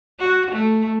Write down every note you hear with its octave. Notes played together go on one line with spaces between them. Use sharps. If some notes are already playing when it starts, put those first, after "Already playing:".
F#4
A3